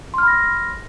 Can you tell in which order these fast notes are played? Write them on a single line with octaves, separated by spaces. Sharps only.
C6 F6 B5 A#6